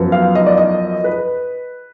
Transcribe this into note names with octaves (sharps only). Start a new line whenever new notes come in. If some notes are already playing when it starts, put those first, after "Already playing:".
Already playing: F#2 F3 B3
F5
D#5
D5
D#5
B4